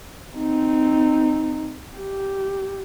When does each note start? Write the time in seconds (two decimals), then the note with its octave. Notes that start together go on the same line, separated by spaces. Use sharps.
0.37 C4 D#4
1.96 G4